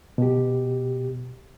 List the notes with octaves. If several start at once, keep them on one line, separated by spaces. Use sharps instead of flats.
B2 G4